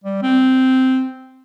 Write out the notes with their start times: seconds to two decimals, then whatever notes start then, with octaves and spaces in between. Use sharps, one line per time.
0.04 G3
0.22 C4